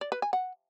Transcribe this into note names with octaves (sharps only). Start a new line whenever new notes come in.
D5
B4
G#5
F#5